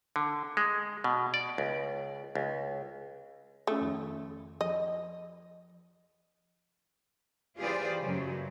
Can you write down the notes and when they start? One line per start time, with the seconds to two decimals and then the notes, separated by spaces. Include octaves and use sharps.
0.16 D3
0.57 G#3
1.04 B2
1.34 D5
1.58 C#2
2.35 C#2
3.67 A3 C#4 F4 D#6
3.81 F2 D#3
4.61 F3 D#5
7.59 E3 F4 G4 G#4 C5 D5
8.00 F#2 C#3 F#3